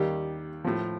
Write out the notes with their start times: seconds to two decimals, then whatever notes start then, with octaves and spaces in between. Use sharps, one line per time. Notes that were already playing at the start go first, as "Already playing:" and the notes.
Already playing: D#2 D#3 G3 G4
0.64 A2 F3